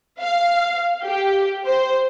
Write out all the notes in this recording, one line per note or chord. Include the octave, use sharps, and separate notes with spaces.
F5
G4
C5